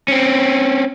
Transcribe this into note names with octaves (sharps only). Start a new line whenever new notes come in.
C4 C#4